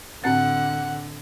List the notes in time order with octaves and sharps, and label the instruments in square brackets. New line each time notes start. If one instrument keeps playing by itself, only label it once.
[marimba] A2 C4 A6 [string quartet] D3 [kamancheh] F#5